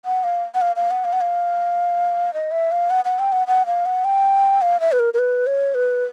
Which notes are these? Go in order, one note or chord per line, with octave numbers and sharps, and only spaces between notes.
F#5
F5
F#5
F5
F5
F#5
F5
F#5
F5
D#5
E5
F5
F#5
F#5
G5
F#5
F#5
F5
F#5
G5
F5
E5
B4
A#4
A#4
B4
C#5
B4